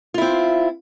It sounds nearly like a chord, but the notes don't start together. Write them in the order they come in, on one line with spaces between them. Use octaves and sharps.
F4 E4 C4